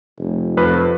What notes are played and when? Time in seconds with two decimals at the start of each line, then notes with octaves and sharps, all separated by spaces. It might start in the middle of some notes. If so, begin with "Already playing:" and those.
0.20 F1
0.57 F2 B4